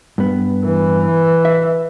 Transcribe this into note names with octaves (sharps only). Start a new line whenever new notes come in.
G2 B3
E3
E5